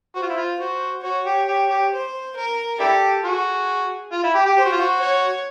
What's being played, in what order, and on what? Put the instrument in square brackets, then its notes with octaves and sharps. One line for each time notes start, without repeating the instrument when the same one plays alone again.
[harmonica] F#4 [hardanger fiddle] C5
[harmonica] F4
E4
F4
[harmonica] F#4 [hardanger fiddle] C5
[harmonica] F#4 [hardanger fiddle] C#5
[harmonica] G4
G4
G4
[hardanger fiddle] C5
A#4
[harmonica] D4 E4 G4 [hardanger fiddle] A4
[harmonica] F#4 [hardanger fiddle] G#4
[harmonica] F4
E4
G4
G4
[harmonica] G4 [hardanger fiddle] C5
[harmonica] F#4
F4
F#4
[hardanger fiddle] C#5